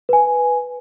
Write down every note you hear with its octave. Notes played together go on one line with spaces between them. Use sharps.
B4 G#5